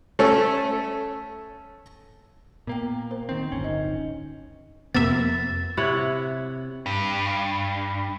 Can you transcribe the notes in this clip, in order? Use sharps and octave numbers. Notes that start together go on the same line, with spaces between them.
A3 C#4 A4
A#2 A#3 B3 G5
A#4 C5
D#3 C4
D1 G1 C#4
D#4 D#5
F2 C3 A#3 B3 E5 A6
C3 E4 C#5 F#5
G2